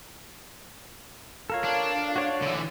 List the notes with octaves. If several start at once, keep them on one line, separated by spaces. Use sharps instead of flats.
F4 A4 A#4 C#5 F5
D4
F#4 C#5 D5
D3 E3